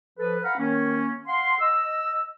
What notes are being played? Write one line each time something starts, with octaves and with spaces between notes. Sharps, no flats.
F3 A4 B4
F5 F#5 A#5 B5 F6
D#3 A#3 C#4
F5 F#5 C6
D#5 E6